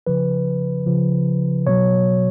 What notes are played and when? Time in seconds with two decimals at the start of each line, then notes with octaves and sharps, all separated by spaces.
0.07 C#3 F3 B4
0.86 C#3 F3
1.67 B2 F#3 C#5